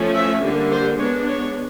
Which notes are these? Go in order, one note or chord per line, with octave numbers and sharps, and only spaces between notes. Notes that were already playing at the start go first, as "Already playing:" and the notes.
Already playing: F3 A3 C#4
E5
D3 G3 A#3
C5
G#3 B3 D4 C#5
C#5